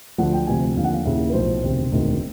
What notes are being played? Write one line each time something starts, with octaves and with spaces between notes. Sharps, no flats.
D2 D3 F3 F#5
G5
D2 C3 F3 G#5
D#2 D3 F3 F5
F#5
F5
D#2 C#3 E3 E5
B4
B1 A2 F3 C5
E1 D2 C3 D#3
E1 D2 C3 D#3